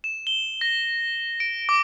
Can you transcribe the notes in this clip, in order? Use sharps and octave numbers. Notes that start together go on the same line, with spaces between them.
E7
G7
A#6
D7
D6